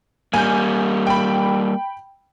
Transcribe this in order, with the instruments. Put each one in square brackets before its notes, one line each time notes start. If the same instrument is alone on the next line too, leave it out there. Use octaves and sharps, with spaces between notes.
[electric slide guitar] G3 A#3 [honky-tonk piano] G#5 G6
[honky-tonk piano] G5 B5